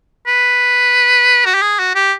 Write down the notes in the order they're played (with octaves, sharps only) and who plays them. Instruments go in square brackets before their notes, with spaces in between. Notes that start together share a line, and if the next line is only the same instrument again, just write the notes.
[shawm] B4
F#4
G4
G#4
F#4
G4